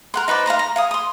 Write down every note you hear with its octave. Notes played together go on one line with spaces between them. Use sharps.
A#4 F#5 C6
D#4 B4 C5 D5
F5 A5 A#5 C6
A#5
F5 G#5 D#6
C6 D#6